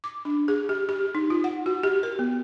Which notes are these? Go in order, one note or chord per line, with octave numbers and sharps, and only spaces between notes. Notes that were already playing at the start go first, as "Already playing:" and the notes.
D6
D4
G#4
G4
G4
D#4
F4
F#5
F#4
G4
A#4
B3